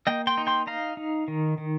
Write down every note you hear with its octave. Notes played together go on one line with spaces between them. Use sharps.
A#3 D#5 G5
G5 C6
D#4
G5 C6
D#4 F5 A#5
D#4
D#3
D#3